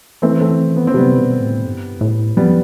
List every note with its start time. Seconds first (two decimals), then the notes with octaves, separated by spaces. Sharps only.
0.22 E3 A3 C4
0.41 A3 C4
0.76 B3
0.87 C4
0.94 C3 G3 B3
1.18 B2
1.41 A2
1.65 G2
2.01 A2
2.37 F2 G3 B3